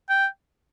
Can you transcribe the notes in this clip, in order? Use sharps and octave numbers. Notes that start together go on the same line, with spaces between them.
G5